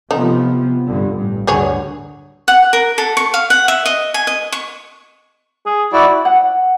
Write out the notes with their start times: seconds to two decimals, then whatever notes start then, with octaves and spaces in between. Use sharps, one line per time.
0.11 C3 F3 A3 B3 D#4
0.86 G2 D3
1.15 A1 G2
1.47 D2 G2 D3 F#3 G#4 C#5
2.48 F#5
2.73 A#4
2.98 A4
3.17 C#6
3.34 F5
3.50 F#5
3.68 E5
3.86 D#5
4.14 G#5
4.27 D#5
4.52 C#6
5.66 G#4
5.93 E4 F#4 D5
6.25 F#5